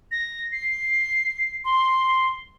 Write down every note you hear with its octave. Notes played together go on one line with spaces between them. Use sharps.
A#6
C7
C6